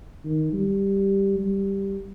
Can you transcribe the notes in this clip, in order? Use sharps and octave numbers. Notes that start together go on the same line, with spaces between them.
D#3
G3
G3